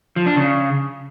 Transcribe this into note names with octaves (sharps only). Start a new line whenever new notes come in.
F3
D4
C#3